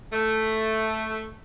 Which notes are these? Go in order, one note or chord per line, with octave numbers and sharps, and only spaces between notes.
A3